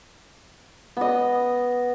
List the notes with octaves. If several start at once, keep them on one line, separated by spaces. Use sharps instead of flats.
B3 D#5